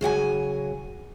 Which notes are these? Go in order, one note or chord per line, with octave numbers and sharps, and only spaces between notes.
C#3 F#3 F#5 G#5